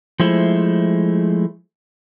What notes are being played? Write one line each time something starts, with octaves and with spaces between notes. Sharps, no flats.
F3 G#3 A3 E4 C5